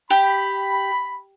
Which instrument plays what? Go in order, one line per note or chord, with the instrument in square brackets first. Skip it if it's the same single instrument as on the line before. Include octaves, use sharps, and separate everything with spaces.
[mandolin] G4 [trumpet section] B5